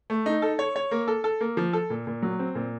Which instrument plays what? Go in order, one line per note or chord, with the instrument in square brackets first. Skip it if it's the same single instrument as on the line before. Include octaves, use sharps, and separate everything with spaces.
[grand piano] A3
D#4
A4
C#5
C#5
A#3
A4
A4
A#3
F3
A4
A#2
A#2
F#3
C4
A#2